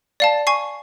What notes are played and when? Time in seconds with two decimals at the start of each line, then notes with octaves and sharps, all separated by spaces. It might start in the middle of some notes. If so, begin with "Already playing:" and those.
0.20 D5 F5 A5
0.47 G#5 C#6 C7